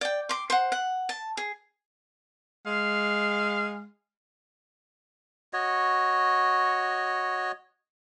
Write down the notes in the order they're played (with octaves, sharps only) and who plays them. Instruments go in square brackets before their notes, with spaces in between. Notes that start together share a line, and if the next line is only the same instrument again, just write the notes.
[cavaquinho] D5 G5
C6 D6
C5 F#5
F#5
A5
G#4
[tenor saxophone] G#3 [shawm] F5
[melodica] F#4 C#5 D#5